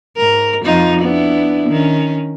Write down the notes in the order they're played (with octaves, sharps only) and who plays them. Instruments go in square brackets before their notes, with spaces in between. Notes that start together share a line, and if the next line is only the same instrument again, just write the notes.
[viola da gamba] G#2 A#4
F2 D#4 F4
B3 D4 E4
D#3 C#4